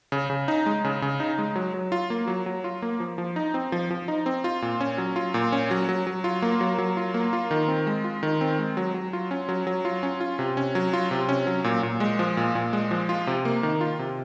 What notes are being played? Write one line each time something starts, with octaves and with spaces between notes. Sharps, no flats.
C#3
C#3
D#4
G#3
C#3
C#3
D#4
G#3
F#3
F#3
F4
A#3
F#3
F#3
F4
A#3
F3
F3
D#4
C4
F3
F3
D#4
C4
F4
A#2
C#4
F#3
F4
A#2
C#4
F#3
F#3
F#3
F4
A#3
F#3
F#3
F4
A#3
F4
D#3
C4
G#3
F4
D#3
C4
G#3
F#3
F#3
F4
C#4
F#3
F#3
F4
C#4
F4
C3
C#4
F#3
F4
C3
C#4
F#3
A#2
A#2
G#3
F3
A#2
A#2
G#3
F3
F4
C3
A#3
D#3
F4
C3